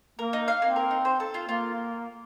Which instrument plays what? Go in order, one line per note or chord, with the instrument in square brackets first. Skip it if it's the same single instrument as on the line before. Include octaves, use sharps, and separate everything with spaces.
[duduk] A#3 [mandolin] A#4
[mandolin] D#4
F5
[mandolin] A#3 [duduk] C4
[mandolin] A#4
D#4
C5
A4
F4
[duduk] A#3 [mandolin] F4